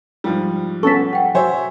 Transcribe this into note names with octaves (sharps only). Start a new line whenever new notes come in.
G#2 F3 G3
B3 C#4 A4 C#6 B6
F#5 G5
F#3 C5 C#5 E5 G#5